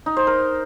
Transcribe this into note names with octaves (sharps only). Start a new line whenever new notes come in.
D#4
C5
A#4